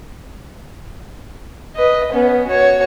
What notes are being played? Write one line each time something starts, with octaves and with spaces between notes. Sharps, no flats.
B4 D#5
B3 C#4
F#4 C#5